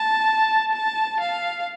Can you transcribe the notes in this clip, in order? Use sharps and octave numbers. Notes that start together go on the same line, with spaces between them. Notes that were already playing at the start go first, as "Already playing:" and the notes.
Already playing: A5
A5
F5